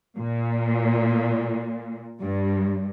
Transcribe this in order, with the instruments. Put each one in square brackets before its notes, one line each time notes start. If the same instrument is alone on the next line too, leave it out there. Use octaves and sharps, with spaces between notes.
[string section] A#2
G2